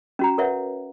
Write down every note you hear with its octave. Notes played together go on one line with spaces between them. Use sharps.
C#4 F#4 A#5
A#4 B4 C#5 E5 F#5